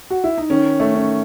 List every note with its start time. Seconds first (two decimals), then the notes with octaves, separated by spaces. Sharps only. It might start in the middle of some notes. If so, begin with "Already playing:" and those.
0.10 F#4
0.24 E4
0.38 D#4
0.50 D#3 C#4
0.80 A3
0.95 C#4